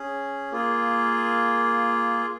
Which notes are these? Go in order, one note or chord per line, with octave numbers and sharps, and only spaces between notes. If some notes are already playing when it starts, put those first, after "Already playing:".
Already playing: C#4 G#4
A#3 F4 G#4